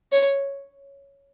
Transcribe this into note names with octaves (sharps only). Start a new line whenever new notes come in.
C#5